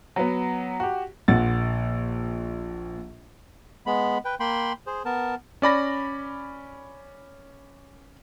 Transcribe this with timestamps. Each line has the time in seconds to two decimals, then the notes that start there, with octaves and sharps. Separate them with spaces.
0.16 F#3 B3
0.80 F#4 G4
1.28 A#1 A#2 F#5 A6
3.86 G#3 B3 B5
4.25 B4 G5
4.40 A#3 G5 B5 C6
4.87 G#4 C5
5.05 B3 A#4 A5
5.62 C#4 D5 B5 A#6